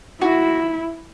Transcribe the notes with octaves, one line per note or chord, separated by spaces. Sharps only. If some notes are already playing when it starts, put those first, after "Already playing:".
E4 F#4